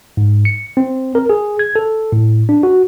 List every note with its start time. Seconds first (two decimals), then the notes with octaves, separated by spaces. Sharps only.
0.17 G#2
0.45 C#7
0.77 C4
1.15 A#4
1.30 G#4
1.59 G#6
1.76 A4
2.12 A2
2.49 D4
2.63 F#4